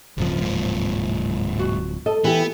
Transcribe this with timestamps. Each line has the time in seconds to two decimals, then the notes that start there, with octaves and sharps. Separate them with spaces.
0.18 D1 G2 C#3 F3
0.42 G#2 A#3
1.59 F#4
2.06 A4 D#5
2.24 E3 B3 G4